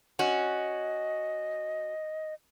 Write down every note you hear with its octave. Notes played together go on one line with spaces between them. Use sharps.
C#4 F#4 D#5